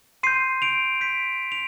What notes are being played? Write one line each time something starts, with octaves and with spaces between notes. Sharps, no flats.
C6 G6 C7 D#7
D7 F7
C6 G6 B6 D7
D7 F7